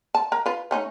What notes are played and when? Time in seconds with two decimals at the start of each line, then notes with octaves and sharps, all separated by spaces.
0.15 A5
0.32 A#4 A#5
0.46 F4 B4
0.71 A3 C#4 D#4